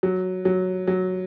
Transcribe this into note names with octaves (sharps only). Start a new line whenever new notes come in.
F#3
F#3
F#3